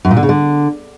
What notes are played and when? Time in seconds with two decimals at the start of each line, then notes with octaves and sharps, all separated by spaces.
0.05 F#2
0.11 A#2
0.17 D3
0.23 C#3
0.29 D3